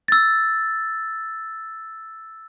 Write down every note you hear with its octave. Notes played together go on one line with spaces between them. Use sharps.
E6 A6